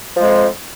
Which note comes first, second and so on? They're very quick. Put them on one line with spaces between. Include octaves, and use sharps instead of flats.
F3 G#3 F2